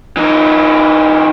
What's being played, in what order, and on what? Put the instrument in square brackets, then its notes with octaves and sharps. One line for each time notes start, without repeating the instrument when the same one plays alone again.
[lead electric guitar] E3 D#4